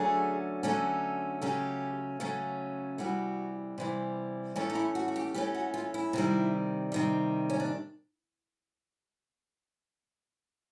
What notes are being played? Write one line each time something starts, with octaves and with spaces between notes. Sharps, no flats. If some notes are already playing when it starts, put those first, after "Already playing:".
Already playing: D3 F#3 A3 C#4 G#4
D3 F#3 A3 C#4
C#3 F#3 A3 C#4 G4
C#3 F#3 A3 C#4
C3 E3 G3 F#4
C3 E3 G3
E3 A3 C#4 F4
D#4
E4
F#4
F#4
G4
E3 A3 C#4 G4
F#4
F4
E4
C3 D#3 G3
C3 D#3 G3
C#4
D4